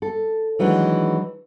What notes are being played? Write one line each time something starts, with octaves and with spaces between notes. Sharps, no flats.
A4
D#3 E3 F#3 G#3 D4